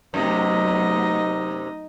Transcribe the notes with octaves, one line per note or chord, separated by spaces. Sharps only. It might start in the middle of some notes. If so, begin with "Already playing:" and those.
F#2 C3 F#3 A3 B3 D#4 D#5